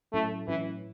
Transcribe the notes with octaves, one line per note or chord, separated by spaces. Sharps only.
A2 F#3 A3 C#4 E4
A2 E3 F#3 C#4 E4